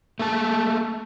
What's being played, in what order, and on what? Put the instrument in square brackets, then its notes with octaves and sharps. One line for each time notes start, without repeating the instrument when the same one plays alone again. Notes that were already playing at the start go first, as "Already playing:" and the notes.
[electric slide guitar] A3 A#3 A5